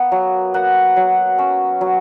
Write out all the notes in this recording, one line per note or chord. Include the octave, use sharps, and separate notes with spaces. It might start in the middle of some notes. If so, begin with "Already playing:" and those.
Already playing: A#3 B3
F#3
A#3 F#5
F#3
C#4
F#3